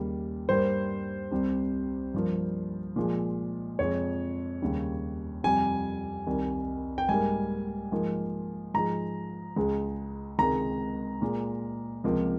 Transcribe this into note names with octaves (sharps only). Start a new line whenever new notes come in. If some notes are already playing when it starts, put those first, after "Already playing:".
Already playing: D#2 C#3 G3 A#3
G2 G3 A#3 C5
C2 C3 G3
G2 F3 A#3
A#2 F3 G#3
F2 C3 F3 G#3 C#5
D#2 C#3 G3
F2 C3 G3 G#5
C2 C3 D#3 G3
G5
G#2 G3 A#3 G#5
G#2 F3 A#3
G#2 F3 G#3 A#5
C#2 C#3 G#3
C#2 C3 D#3 G#3 A#5
A#2 G#3
C#2 C3 F3 A#3